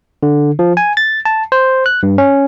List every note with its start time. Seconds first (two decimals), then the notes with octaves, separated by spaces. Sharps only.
0.23 D3
0.59 F3
0.77 G#5
0.97 A6
1.25 A5
1.52 C5
1.86 F#6
2.03 G2
2.18 C#4